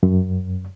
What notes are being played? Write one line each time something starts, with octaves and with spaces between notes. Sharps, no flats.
F#2